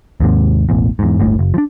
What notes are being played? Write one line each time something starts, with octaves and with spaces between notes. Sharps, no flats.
D#2 G#2 C3
E1 A1 E2
E2 G#2
G1 D2 A2
F#1
F3 D4